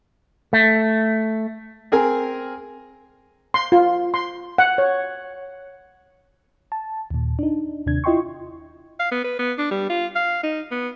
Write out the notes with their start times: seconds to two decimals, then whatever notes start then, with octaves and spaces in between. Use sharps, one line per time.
0.53 A3
1.92 C4 G#4 A#4 G#5
3.54 C6
3.72 F4
4.14 C6
4.58 F#5
4.78 C#5
6.72 A5
7.10 D#2 A#2
7.39 D4 D#4
7.86 D#2 C3 D4 G#6
8.04 E4 F4 D#5 G5 C6 C#6
9.00 F5
9.11 B3
9.24 B4
9.39 B3
9.58 D4
9.71 G3
9.90 F4
10.16 F5
10.43 D#4
10.71 B3